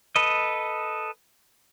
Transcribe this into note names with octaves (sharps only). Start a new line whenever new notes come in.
A4 B4 D#5